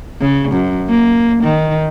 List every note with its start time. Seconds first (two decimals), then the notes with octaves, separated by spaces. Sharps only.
0.20 C#3
0.52 F#2
0.89 A#3
1.43 D#3